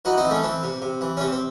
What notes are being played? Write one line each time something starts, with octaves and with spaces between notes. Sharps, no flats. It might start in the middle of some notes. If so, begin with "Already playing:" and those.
E3 D#4 F#4
C4 D#4
E3
A3 C#4
E3 C4
C3
C3
E3
C#4
C3 C4
C4